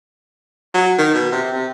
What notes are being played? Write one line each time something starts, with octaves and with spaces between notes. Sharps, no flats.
F#3
D#3
B2
C3
C3